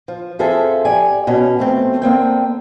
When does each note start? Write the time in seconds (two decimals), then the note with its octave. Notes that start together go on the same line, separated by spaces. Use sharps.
0.08 F3
0.39 F2 F3 G#4 A4 C5 E5
0.85 G4 D5 G#5
1.27 B2 C#4
1.59 F3 A3 C4
2.02 D3 A#3 C4 G5